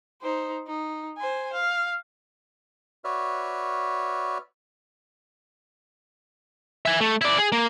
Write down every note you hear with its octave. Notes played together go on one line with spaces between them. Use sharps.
D#4 C5
D#4
C5 G#5
F5
F#4 B4 C#5 D5 E5 F6
E5 G#5
A3
E4 D5
G#4
A#3